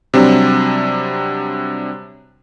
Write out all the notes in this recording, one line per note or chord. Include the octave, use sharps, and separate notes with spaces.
C3 F#3 G3 C4 D4